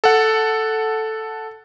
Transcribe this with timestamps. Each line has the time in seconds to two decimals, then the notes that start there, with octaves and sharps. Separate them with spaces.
0.04 A4 F#5